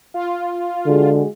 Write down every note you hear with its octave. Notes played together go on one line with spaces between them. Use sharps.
F4
D3 G#3 F#4 G#4